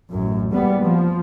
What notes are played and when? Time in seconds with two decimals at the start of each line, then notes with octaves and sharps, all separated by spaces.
0.11 A1 F#2
0.52 F#1 G3 B3
0.82 F3